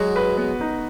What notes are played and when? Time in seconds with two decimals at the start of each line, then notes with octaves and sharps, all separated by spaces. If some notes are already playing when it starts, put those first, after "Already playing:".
Already playing: F#3 G#3 F#4
0.16 B4
0.37 B3
0.61 D#4